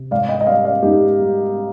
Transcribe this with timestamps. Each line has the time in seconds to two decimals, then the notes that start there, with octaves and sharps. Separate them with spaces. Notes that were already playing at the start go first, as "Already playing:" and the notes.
Already playing: C3
0.11 G#2 D5 F5
0.29 D#5 G5
0.41 D#5
0.47 G3 D5 F5
0.65 D5 F5
0.82 G#2 D#4 G4
1.20 G3